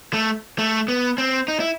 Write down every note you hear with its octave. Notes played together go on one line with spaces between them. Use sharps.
A3
A3
B3
C4
D#4
E4